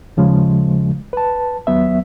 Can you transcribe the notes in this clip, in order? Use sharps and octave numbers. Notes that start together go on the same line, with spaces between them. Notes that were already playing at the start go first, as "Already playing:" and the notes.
D#2 C#3 F3 G#3
B4 A5
D#2 F#3 B3 E5